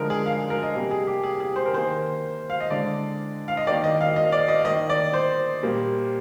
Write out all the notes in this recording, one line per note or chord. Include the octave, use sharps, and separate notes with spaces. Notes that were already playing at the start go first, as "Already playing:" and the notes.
Already playing: D3 F3 G#3 A#4
G#4
F5
A#4
D#5
C3 G3 A#3
G#4
G4
G#4
G#4
C5
A#4
D#3 A#3 C5
F5
D#5
D3 G#3 D5
F5
D#5
D#3 A#3 D5
D#5
F5
D#5
D5
D#5
D#3 A#3 D#5
D5
C5
A#2 G3 A#3